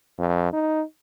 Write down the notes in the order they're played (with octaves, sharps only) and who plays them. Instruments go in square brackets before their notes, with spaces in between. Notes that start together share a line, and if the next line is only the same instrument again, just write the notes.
[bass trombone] F2
D#4